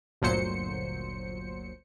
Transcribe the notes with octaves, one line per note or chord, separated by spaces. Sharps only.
G1 D2 A#2 F#3 C5 C#7